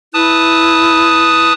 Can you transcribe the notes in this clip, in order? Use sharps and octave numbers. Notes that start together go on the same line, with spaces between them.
E4 B4 A5 D#6